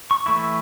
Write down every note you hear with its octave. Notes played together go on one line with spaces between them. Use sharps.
C#6
E3 A3 E4 C#6